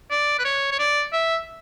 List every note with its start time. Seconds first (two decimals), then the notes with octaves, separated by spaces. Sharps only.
0.11 D5
0.39 B4
0.44 C#5
0.71 C#5
0.79 D5
1.13 E5